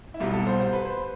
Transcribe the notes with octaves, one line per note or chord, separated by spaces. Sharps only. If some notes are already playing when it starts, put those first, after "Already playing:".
E4
C2 B2 G3 F4
A4
C5
C5
B4
C5